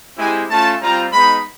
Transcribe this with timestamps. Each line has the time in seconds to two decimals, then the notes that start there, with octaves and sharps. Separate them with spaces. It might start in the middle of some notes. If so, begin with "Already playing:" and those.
0.17 G#3 C4 E4 G4 G#5
0.49 A3 C#4 F4 A5
0.81 G3 C4 F4 A#5
1.12 G#3 B3 D#4 B5